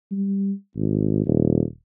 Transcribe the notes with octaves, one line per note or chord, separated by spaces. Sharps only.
G3
G#1
D#1